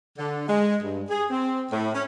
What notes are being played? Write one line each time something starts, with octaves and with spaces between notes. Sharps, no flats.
D3
G#3
G2
G#4
C4
A2
C#4